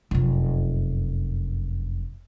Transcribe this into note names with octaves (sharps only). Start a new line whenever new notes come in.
F1 F#2